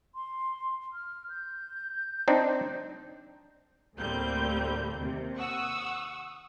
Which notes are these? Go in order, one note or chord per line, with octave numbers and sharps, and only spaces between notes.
C6
F6
G6
C4 D4 D#4
D2 A2 G3 A#3 C4 G6
D#2 C3
F#5 C#6 D#6 E6